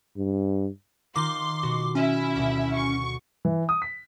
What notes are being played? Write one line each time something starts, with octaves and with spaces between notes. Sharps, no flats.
G2
D#3 D#4 F4 C6 D6
B2 F#4
C#4 E4 E5
D2 B2
C#6
E3
D#6
B6